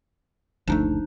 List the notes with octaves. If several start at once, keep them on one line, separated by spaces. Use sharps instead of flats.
F#1 D2 F3 A3 D4 D#4